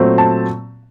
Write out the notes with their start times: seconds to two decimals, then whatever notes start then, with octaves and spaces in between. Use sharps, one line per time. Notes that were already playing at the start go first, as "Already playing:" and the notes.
Already playing: A#2 F#3 A3 C4
0.18 A5